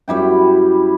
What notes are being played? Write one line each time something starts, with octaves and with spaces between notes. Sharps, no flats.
F#2 G3 E4 G5